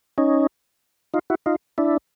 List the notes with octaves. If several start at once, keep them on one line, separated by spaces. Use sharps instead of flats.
C#4 D#4
D#4 F4
E4 F#4
D#4 F4
D4 E4